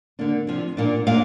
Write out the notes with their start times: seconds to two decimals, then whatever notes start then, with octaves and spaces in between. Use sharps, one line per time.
0.19 D3 A#3 D4
0.47 C3 F3 D4
0.77 A#2 A#3 D4
1.07 A#2 A#3 D4 F5